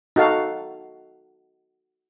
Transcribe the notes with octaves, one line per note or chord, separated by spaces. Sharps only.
D#4 F#4 A4 F5